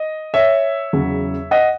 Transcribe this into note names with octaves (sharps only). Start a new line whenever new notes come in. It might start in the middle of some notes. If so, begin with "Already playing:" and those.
Already playing: D#5
C#5 E5
E2 C#3 F#3
D#5 F#5